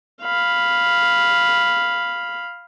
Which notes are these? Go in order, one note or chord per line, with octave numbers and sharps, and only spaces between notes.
F5 B5